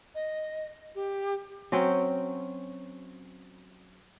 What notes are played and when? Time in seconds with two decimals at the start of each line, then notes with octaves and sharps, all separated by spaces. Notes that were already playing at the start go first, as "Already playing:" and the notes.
0.14 D#5
0.95 G4
1.72 F#3 C4 C#4 G5